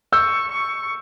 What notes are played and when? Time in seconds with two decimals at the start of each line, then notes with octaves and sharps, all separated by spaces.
0.13 C#6 E6 G6
0.52 C#6